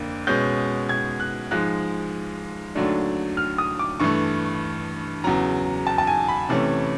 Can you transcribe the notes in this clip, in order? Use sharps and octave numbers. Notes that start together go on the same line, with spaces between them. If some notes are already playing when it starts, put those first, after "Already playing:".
Already playing: F2 D3 A#3
B2 G#3 C#4 G6
G#6
F#6
G#2 F3 G#3 F#6
D#2 D3 F#3 A3 D4
F6
D#6
D6
G2 E3 A3 C#6
E2 C#3 F#3 A#5
A5
A5
G#5
B5
C3 E3 A3 C#4